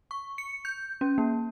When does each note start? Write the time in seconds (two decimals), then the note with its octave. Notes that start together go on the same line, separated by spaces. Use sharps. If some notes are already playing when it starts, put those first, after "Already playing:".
0.11 C#6
0.38 C#7
0.65 G6
1.01 C#4
1.18 A#3